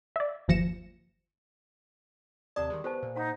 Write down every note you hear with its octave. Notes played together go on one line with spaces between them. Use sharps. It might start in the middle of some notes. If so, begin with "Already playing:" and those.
D5 E5
G1 D#2 F3 A#6 C#7 E7
D#2 C3 D5 A5 D#6
D#3 G3 G#3
B3 G4 C5 A5
A#2
D#4 C5 F#5 A#5